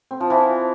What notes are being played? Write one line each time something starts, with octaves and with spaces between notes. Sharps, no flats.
C4
F3
E3